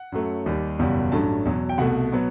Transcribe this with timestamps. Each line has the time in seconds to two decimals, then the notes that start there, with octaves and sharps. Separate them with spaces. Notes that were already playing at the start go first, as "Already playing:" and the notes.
Already playing: F#5
0.12 F#2 F#3 A3
0.46 D#2 D#3 G3
0.79 F#1 E2 B2 G3
1.12 A1 G2 F#3 A3 A5
1.45 E2 B2 F#3
1.69 G5
1.78 C2 B2 A3 F#5
2.12 B2 F#3 B3